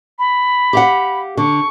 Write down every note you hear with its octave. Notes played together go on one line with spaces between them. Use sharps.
B5
G4 F5 F#5
D3 C#6